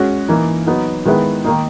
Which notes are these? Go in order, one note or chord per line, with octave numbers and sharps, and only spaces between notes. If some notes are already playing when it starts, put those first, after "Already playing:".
Already playing: G#3 C#4 F#4
E3 A#3 D#4
F#3 B3 D#4
D#3 G#3 B3 E4 B4
D#3 A#3 D#4